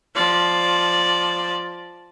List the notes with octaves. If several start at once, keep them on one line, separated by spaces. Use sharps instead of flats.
F3 D5